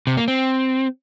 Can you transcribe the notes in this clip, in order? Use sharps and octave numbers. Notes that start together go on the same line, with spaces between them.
C3
A#3
C4